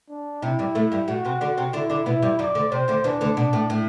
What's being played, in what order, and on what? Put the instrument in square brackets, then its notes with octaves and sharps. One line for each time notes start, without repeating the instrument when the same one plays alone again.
[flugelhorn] D4
[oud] C3 [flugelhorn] E4
[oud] G2 G3
A2 A3
G2 G3
[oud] A2 A3 [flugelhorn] F#4
[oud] C3 C4
D3 D4
C3 C4
[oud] D3 D4 [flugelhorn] E4
[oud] D3 D4
[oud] B2 B3 [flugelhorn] E4
[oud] G2 G3
[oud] F#2 F#3 [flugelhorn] D5
[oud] D2 D3
[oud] C3 [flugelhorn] C5
[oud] D2 D3
[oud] E2 E3 [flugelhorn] D4
[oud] D2 D3
[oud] B2 [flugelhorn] D4
[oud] A2
A2